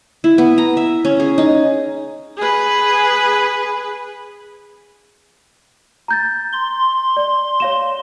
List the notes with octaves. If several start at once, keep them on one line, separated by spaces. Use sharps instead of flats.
E4
B3
A#5
E5
C#4
G#4
D#4
G#4 B4
A#5 G6 A6
C6
D5
C#5 F5 E7